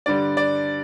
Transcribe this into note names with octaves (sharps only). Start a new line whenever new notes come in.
G2 D3 G3 D5
D5